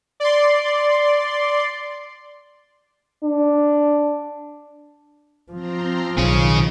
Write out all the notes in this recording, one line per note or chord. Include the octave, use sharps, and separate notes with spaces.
D5 C6
D4
F3 C4 A#5 C6
B1 D#3 C#4 G#4 D#5